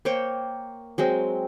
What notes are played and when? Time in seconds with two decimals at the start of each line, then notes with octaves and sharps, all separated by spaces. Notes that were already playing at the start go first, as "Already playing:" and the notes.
0.05 A#3 C5 C#5 G5
0.98 F#3 G#3 C4